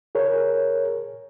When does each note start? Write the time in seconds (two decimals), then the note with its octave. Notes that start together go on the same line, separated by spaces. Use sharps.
0.15 G#4 A#4 C#5